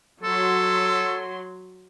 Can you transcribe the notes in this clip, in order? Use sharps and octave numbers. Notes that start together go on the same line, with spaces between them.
F#3 A4 C6